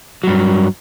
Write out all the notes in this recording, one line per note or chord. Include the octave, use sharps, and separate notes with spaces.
G2 F#3